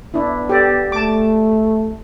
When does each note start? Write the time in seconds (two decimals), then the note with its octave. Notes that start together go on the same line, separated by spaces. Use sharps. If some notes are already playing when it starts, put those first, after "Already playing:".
0.14 B3 D4 E4
0.49 G4 A4 D5
0.92 A3 A5 D6